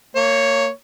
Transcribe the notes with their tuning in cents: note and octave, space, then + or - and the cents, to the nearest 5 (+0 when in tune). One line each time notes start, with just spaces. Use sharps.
A#3 -30 C#5 +0